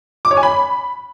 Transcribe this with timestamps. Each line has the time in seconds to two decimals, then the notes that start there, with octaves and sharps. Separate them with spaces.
0.25 D6
0.31 C#5
0.37 G#5
0.43 B5